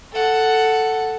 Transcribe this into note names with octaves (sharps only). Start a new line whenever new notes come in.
A4 F#5